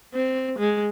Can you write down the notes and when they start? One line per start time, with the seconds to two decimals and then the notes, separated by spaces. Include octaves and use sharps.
0.15 C4
0.58 G#3